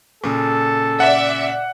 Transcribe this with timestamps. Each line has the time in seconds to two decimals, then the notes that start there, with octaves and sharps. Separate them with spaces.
0.24 A#2 C#3 A4
1.00 D5 E5 F#5